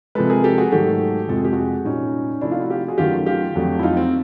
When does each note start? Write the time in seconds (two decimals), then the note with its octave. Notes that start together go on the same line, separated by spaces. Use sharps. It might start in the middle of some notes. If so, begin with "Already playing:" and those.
0.15 C3 F3 G#3 A4 B4
0.30 G#4 A#4
0.44 G4 A4
0.58 F#4 G#4
0.72 G#2 D#3 F#3 A3 G4 A4
1.28 F2 C3 F3 G#3 A4
1.38 G#4
1.45 G4
1.53 F#4 G#4
1.85 A#2 G3 C#4 D#4
2.41 C3 F3 A3 D4 E4
2.51 D#4 F4
2.61 E4 F#4
2.70 F4 G4
2.88 F#4 G#4
2.98 F#2 D#3 F#3 A3 F4 G4
3.26 F4 G4
3.55 F2 D3 F#3 A3
3.79 E4
3.83 D#4 F4
3.97 C4